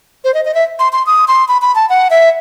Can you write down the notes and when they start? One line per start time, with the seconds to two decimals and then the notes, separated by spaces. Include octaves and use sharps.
0.24 C5
0.34 D#5
0.45 D#5
0.54 E5
0.79 C6
0.93 C6
1.06 D#6
1.28 C6
1.48 B5
1.62 B5
1.75 A5
1.89 F#5
2.10 E5